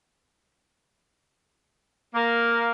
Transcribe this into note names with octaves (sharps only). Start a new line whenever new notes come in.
A#3